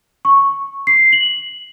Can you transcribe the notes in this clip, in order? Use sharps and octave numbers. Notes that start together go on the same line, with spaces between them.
C#6
C7
F#7